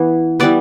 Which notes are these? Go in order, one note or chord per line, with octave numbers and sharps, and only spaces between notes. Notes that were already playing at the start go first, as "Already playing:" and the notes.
Already playing: E3 B3
E3 G3 B3 D5